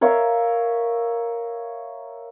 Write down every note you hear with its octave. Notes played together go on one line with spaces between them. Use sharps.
A#4 C#5 E5 F5